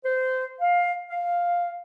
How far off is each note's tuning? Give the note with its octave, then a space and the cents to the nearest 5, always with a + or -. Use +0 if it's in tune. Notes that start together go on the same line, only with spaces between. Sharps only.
C5 -20
F5 +15
F5 +5